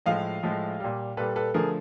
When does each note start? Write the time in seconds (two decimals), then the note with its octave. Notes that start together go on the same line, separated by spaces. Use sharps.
0.06 A2 F3 G#3 D#5 F5
0.43 A2 F3 G#3
0.80 A#2 G3
1.17 A#2 G3 A4 B4
1.36 A4 B4
1.54 D3 F3 A3 G#4 A#4